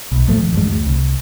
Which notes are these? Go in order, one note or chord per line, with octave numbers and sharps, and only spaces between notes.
B1
D#2 A2 F3 A3
D#1
A1 F#2 G#3
D2
C2